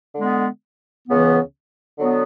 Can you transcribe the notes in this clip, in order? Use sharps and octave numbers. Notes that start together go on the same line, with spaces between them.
D3 G#3 B3
C#2 C#3 E3 B3
D3 F#3 B3